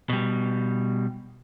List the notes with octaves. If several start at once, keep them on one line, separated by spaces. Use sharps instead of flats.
B2 G3